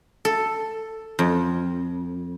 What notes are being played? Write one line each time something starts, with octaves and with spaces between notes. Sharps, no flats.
A4
F2